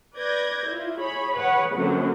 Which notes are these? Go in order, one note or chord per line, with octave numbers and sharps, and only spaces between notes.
B4 D5 G6 G#6 A#6
E4 F4
G#4 C#5 B5
G#4 B4 C#5 F#5 B5
F#2 D3 F#3 A#3 C4